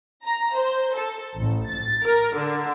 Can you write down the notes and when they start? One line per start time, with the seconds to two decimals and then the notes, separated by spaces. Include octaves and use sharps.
0.25 A#5
0.56 C5
0.95 A4
1.35 A1
1.70 A6
2.05 A#4
2.36 D3